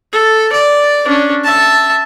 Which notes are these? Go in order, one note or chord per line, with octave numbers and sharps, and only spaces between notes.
A4
D5
C#4 D4
E5 A5